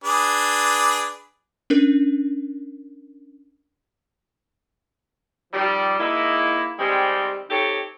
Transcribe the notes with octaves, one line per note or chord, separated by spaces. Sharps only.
D4 G#4 B4
C#4 D4 A#4
D#3 F3 G3
G#3 A#3 D#4 E4
D#3 G3 G#3 C4
C4 D#4 G4 A4 C#5